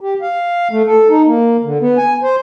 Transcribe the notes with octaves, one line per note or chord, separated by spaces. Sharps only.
G4
F5
A3
A4
D#4
A#3
D3
B3
G#5
C5